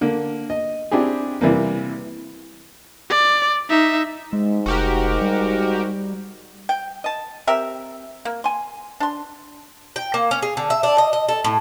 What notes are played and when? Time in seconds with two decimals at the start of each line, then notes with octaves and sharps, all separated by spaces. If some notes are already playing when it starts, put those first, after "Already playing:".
0.01 D3 A#3
0.50 D#5
0.91 C4 D4 E4 G4 G#4
1.41 C3 E3 G3 A#3
3.10 D5
3.69 D#4 E5
4.33 G#2 G#3
4.66 F1 F#4 G4 A#4
5.21 G3
6.69 G5
7.04 D#5 A5
7.47 C4 G4 A#4 E5
8.25 A#3
8.44 G#5 C6
9.00 D4 C6
9.96 G5
10.14 A#3
10.31 C#4
10.42 G#4
10.57 D3
10.70 E5
10.83 D4
10.98 D#5
11.13 D#5
11.28 A4
11.44 A2